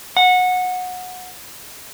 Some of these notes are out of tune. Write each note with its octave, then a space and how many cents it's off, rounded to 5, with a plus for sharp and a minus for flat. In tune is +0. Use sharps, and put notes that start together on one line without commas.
F#5 -20